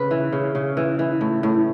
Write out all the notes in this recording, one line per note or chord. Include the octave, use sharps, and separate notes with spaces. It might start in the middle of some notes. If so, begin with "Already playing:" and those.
Already playing: C#3 B4
E3
C#3
C#3
E3
E3
A2
A2